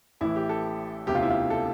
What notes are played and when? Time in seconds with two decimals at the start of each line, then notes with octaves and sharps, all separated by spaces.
0.21 A1 A2 E3 E4
0.36 G4
0.49 A4
1.07 E1 D2 C3 G4
1.15 F4
1.23 E4
1.30 F4
1.50 A4